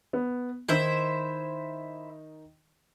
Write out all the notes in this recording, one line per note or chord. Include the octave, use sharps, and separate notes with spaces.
B3
D#3 D#4 E4 C5 E5